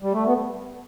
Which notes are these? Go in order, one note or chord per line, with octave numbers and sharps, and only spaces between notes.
G3
A3
B3